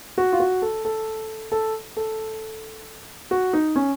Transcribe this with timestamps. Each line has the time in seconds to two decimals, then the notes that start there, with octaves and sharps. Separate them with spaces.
0.18 F#4
0.33 F4
0.40 F#4
0.62 A4
0.85 A4
1.52 A4
1.97 A4
3.31 F#4
3.53 D#4
3.76 C#4